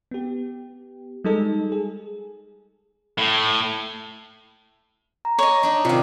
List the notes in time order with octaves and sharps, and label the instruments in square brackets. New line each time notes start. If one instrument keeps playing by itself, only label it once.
[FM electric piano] B3 G4
G3 G#3 D#4 G#4 A4
G#4
[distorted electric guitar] A2
[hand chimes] A#5
[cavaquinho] C#5 D#5
[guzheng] D4 D#4
[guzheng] C3 D#3 [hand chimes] F4 D5 F5